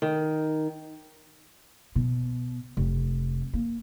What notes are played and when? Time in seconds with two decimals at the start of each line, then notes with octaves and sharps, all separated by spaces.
0.02 D#3
1.95 B2
2.77 F1
3.53 A#3